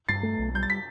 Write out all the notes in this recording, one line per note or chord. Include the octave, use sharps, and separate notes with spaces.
G2 A6 C7
A3
B1
G3 G6
A6
B6